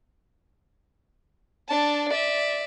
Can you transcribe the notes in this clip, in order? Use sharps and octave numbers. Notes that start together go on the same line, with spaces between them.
D4 A5
D5 E5